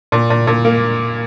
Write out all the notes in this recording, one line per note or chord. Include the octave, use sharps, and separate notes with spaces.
A#2
A#2
A#2
A#3